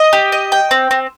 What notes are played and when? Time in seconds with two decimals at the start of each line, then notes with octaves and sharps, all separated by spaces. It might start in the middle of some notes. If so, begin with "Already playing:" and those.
Already playing: D#5
0.13 G4
0.32 D#5
0.52 G5
0.71 C4
0.91 C4